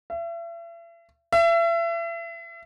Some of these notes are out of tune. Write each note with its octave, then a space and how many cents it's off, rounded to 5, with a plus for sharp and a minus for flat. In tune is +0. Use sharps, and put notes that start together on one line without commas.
E5 +40
E5 +35